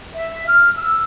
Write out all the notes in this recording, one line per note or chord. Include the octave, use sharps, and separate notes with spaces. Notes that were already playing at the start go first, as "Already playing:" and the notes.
E5
F6
E6